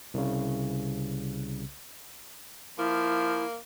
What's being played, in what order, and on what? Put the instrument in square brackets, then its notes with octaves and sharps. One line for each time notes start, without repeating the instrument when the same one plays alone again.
[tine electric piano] C2 C#3
[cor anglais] F3 [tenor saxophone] A#3 [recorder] E4